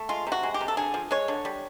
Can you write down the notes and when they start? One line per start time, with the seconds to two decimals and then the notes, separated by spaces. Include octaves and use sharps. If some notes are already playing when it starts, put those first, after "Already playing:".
Already playing: A3
0.09 G#3 F4
0.27 C3
0.32 F#4
0.43 G#3
0.54 G4
0.61 C3
0.68 A4
0.77 D3 G#4
0.94 F3
1.11 G#3 C#5
1.28 D3
1.45 G3